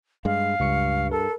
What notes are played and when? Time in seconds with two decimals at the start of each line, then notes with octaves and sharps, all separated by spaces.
0.25 G2 G#3 F5
0.60 C#2 G2 C#6 C#7
1.11 A4 A#4